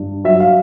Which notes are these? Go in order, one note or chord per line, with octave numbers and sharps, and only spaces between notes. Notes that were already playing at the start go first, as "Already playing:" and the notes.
Already playing: G2
F#3 E5
F5